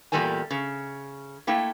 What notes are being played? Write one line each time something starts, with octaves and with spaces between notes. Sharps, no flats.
E2 A#2 G3 A4 A#4 G#5
C#3
A3 A#3 E4 G5